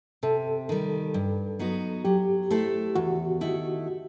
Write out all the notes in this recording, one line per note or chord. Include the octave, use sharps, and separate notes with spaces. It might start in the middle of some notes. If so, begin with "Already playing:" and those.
C3 A4
D#3 G3
G2
F#3 B3 D#4 F#4
F#3 G4
A3 E4 A4 C5
E2 F#4
D#3 A3 E4